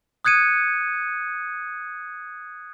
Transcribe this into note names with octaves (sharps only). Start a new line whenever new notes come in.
D#6 F#6 G#6 C#7 D#7